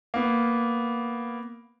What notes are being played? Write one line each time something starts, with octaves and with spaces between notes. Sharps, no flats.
A#3 B3